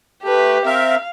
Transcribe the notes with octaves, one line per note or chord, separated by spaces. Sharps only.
A3 G4 B4
C4 A#4 E5 F5